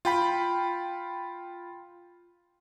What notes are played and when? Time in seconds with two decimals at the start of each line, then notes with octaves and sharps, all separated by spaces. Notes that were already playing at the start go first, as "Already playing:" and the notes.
0.05 F4 G5 B5